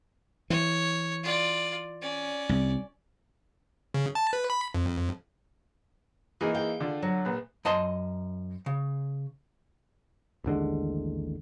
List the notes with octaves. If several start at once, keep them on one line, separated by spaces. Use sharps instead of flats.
E3 C#5
F4 D5
C#4 D5
C2
C#3
A5
B4
B5
F2
E3 A#3 D#4 G#4
F5 G5
D3 F4 D5
F#3
A#1 B4
F#2 D#5 A5 C6
C#3
A1 D#2 D3 G#3